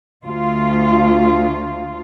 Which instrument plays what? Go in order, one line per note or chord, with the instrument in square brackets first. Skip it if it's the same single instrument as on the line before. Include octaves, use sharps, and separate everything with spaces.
[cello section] D2 F4